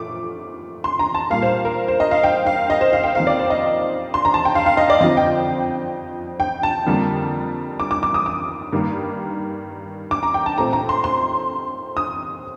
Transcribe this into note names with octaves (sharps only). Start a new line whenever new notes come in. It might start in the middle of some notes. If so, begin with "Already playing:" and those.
Already playing: A#2 F3 A3 D6
C6
A#5
A5
A#2 G3 A#3 F5
C5
A#4
C5
D#5
F5
G5
F5
D#5
C5
F5
G5
F2 D#3 A#3 F5
D5
C5
D#5
C6
A#5
A5
G5
F5
F5
D#5
D5
F2 D3 F3 C4 D#5
G5
G5
A5
F2 D3 G3 A#3
D6
D6
D6
D#6
D6
G2 D#3 A#3
D6
A#5
G5
A5
A#2 A3 C4 A#5
A#5
C6
C6
D#6